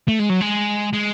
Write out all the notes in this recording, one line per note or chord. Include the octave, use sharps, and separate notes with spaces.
A3
G#3
F#3
G#3
G#3